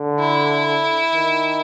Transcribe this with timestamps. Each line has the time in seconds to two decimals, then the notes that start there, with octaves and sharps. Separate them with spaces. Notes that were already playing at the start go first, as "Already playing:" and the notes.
Already playing: D3
0.19 E4
1.15 D#3